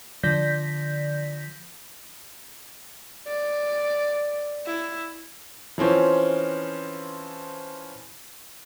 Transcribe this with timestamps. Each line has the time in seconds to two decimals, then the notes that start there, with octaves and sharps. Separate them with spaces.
0.23 D3 F3 D5 G6 A#6 B6
3.27 D5
4.66 E4
5.78 E3 F3 C4 C#4